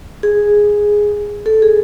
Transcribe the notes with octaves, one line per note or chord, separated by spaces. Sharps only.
G#4
A4
G#4